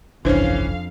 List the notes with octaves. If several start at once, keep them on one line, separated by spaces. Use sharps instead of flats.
G1 C2 F2 E3 C#4 D4 C5 F5